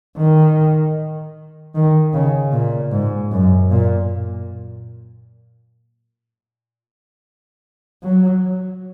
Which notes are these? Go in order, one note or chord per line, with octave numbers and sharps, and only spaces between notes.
D#3
D#3
C#3
A#2
G#2
F#2
A#2
F#3